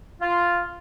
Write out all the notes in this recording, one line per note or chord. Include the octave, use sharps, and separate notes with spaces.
F4